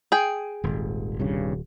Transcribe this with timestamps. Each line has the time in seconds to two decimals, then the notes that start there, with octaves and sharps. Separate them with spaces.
0.12 G#4 G5
0.64 D#1 G#1
1.20 C2 G2 C#3